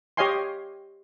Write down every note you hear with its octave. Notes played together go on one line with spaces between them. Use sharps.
G4 C#5 D#5 F5 G#5 C6